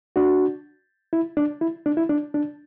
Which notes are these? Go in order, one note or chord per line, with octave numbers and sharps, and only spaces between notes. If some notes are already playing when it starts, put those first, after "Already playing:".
D4 F#4
E4
D4
E4
D4
E4
D4
D4